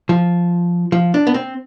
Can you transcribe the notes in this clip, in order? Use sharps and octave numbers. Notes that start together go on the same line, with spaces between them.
F3
F3
D4
B3
C4